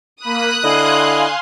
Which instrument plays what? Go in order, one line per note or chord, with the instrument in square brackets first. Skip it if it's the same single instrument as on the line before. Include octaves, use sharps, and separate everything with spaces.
[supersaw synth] A#3 B5 [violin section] D#6 F#6
[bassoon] D3 [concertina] E4 D#5 [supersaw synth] F5 G#5 C6